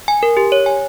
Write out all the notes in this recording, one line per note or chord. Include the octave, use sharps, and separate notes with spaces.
G#5
A#4
G4
C#5
G#5